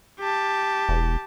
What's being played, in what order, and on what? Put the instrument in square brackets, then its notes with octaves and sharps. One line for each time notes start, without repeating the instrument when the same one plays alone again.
[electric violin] G4 A5
[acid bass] E1